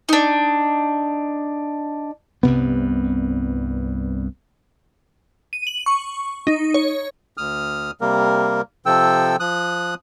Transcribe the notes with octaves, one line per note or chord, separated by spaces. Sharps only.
D4 D#4
C2 G2 C3 B3
D#7
F#7
C#6
D#4
C#5
D2 D#6 F6
C3 G3 A#3 A#4
C3 F3 A4 G5 E6
F3 D#6 F#6